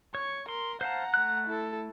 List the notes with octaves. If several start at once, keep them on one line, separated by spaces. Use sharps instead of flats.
C#5 C#6
A#4 C6
C5 F5 F#5 A5 A#5
A3 F#6
E4 A4